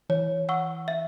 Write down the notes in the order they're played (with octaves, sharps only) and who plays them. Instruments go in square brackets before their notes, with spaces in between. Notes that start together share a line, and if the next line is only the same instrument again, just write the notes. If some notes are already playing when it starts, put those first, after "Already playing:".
[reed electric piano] E3 [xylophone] C#5
[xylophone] F#5 C#6 E6
E5